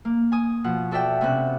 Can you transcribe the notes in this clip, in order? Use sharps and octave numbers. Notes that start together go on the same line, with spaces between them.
A#3
G#5 D#6
B2 F3 F#5
F#4 A4 D5 E5 F#5 G5
C3 B3 C#4 F#4 F#6